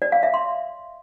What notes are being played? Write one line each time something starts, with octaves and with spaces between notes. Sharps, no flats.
D5
F5
E5
C6